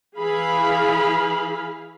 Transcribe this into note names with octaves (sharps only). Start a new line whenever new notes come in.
E3 E4 G#4 F5 B5